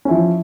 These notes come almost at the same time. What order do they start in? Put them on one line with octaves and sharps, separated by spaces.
C#4 E4 F3